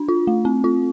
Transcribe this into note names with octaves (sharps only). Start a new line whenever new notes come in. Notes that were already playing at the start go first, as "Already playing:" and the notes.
Already playing: D4
F4
A3
C4
F4